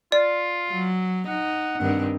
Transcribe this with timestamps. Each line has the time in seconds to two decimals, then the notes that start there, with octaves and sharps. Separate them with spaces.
0.12 F4 D5
0.70 F#3
1.28 D#4 F#5
1.81 G2 D#3 C4